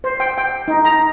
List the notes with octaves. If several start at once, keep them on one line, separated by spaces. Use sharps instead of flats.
C5
G5
G5
D#4
A#5